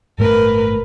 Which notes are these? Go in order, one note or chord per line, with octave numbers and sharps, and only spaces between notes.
G1 A2 A3 A#4 B4